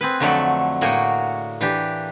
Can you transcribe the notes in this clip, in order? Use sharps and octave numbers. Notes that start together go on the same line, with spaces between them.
C4 G#4 B4
F2 D3 F#3 A3 D5 B5
A2 A#3 F#4 G#4 G5 G#5
E3 D4 G4